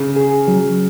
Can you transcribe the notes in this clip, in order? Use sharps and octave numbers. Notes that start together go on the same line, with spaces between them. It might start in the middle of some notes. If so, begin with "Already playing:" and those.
Already playing: C#3
G#4
F#3